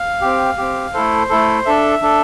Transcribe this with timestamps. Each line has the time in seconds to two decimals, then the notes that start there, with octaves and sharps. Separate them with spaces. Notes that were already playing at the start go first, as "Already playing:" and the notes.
Already playing: F5
0.22 C4 G4
0.57 C4 G4
0.94 A3 E4 A4 C5
1.30 A3 E4 A4
1.66 D4 A4 E5
2.02 D4 A4